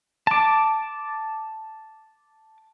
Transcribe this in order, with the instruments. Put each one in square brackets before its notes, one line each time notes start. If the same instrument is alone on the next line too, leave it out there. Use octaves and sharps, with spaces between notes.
[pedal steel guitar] A5 D6